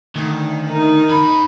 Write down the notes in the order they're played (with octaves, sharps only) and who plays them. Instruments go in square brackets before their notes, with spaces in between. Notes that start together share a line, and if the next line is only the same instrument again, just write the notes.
[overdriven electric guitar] D2 [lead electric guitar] D#3
[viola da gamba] D#4 [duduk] A#4
[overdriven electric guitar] F#2 B5